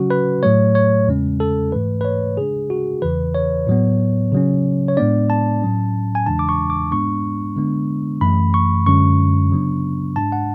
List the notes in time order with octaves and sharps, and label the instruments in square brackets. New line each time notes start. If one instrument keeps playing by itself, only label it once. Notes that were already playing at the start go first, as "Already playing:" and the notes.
Already playing: [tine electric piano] C#3 F#3 C#4 F#4
B4
A2 F#3 A3 C#5
C#5
E2 C#3 G#3 C#4
A4
G#2 E3 A3 B4
B4
C#5
C#3 G#3 D4 G#4
F#4
E2 C#3 E3 B4
C#5
A2 F#3 B3
C#3 F#3 C#4
C#5
A2 G#3 B3 D4 D5
A5
A2 F#3 C#4
G#5
E2 C#3 E3 G#3 D4 A5
D6
C#6
D6
G#2 G#3 B3 D4 C#6
D3 G#3 B3 D4
F#2 E3 A3 B5
C#6
F#2 D3 G#3 C#4 C#6
C#3 F#3 B3 D4
G#2 G#3 D4 A5
F#5